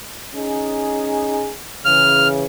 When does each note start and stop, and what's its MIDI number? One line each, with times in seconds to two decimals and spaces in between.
0.35 1.50 61
0.35 1.50 63
0.35 1.50 68
1.85 2.46 49
1.85 2.46 52
1.85 2.28 89